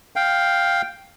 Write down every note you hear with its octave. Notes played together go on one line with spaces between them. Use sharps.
F5 G5